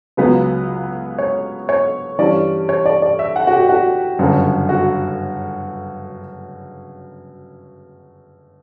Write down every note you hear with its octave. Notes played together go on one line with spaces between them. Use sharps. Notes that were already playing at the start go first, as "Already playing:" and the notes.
C#2 C#3 F#3 B3 B4
C#5
C#5
G2 E3 G3 C#4 D5
C#5
D5
D5
E5
F#5
F#4
G4
F#4
G1 F#2 C#3
F#4